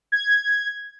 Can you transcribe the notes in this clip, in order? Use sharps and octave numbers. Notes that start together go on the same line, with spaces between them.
G#6